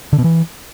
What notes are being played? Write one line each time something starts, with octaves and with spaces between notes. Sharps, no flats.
D3
B2
E3